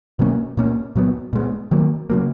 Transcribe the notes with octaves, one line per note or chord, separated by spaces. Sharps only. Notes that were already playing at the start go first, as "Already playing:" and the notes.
B2 F#3 A#3 C#4
A#2 A#3 C#4
A#2 F#3 B3
A#2 G#3 B3
D#3 F#3 A#3
C#3 F#3 A#3